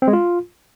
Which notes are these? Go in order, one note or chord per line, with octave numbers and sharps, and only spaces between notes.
C4
G#3
F4